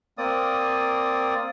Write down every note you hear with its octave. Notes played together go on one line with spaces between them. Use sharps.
A#3 C4 D5 D#6